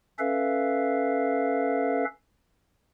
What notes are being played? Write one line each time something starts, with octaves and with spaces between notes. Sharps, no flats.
C#4 A4 B4 E5 F5